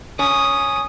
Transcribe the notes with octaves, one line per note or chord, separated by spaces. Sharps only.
C#4 D#6